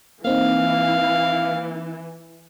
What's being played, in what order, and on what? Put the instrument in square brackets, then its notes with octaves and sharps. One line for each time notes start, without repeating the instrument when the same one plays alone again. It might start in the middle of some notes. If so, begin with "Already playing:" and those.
[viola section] E3 [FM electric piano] A#3 C4 D#4 [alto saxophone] F5